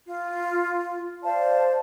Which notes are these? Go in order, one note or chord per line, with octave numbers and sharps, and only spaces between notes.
F4
C5 D5 F5 A5